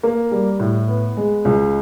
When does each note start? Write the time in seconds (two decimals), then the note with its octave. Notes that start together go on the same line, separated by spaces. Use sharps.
0.03 A#3
0.32 G3
0.60 A2
0.88 B3
1.17 G#3
1.45 C#2